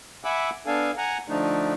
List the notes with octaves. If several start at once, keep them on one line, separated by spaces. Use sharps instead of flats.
E5 F#5 G#5 B5 D6 E6
B3 D4 A4 F5 G#5
F#5 G#5 A#5
D3 F3 A3 D4 D#4